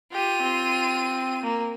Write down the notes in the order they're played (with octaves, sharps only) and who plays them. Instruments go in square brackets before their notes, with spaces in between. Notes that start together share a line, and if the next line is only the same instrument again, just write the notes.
[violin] F4 D#7 [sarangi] G4
[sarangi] C4
A#3